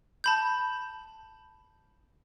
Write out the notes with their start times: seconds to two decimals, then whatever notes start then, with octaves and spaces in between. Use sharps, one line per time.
0.24 A5 B5 G6